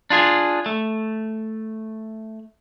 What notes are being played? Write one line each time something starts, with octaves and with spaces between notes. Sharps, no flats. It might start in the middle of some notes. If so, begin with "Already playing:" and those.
D4 F4 G#4
A3